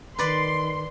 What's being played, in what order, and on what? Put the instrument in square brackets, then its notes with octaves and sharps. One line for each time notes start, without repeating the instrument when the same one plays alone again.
[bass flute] D#3 [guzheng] B4 D5 [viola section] C6